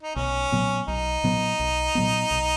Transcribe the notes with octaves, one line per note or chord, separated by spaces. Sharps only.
D#4
B1 C#4
A#2 F#3 B3
B1 D#4
A#2 F#3 B3
B1
A#2 F#3 B3
B1